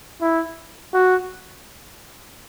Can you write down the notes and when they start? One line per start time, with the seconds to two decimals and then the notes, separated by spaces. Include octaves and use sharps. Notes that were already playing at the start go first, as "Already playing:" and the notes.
0.21 E4
0.94 F#4